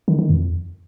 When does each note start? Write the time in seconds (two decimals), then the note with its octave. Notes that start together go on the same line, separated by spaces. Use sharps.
0.08 D#3
0.19 D#3
0.29 F2